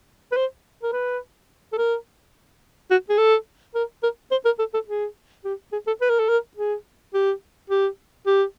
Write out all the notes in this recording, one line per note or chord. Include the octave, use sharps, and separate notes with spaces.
B4
C5
A#4
B4
A4
A#4
F#4
G#4
A4
A#4
A#4
C5
A#4
A4
A4
G#4
G4
G#4
A4
B4
A#4
A4
A#4
G#4
G4
G4
G4